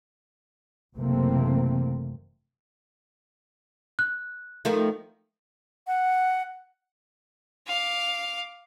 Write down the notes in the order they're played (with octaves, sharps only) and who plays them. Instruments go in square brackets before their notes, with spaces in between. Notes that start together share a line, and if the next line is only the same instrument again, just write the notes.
[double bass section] F#1 C3 E3 A3 A#3 C4
[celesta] F#6
[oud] D#3 F3 A3
[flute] F#5
[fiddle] F5 D6